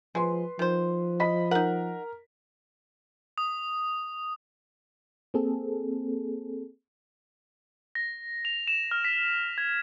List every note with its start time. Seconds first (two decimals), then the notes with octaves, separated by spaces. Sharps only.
0.15 F3 G#3 B4 C6
0.59 D#3 F3 C5
1.20 D#5 B5 B6
1.51 D#4 A#4 F#5
3.38 D#6
5.34 A#3 C4 G#4 A4
7.95 A#6
8.45 F7
8.67 E7
8.91 F6
9.04 B6
9.58 G#6